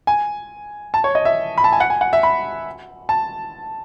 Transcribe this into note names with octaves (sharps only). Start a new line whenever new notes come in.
G#5
A5
C#5
D#5
E5
B5
A5
G#5
F#5
G#5
F#5
E5
B5
A5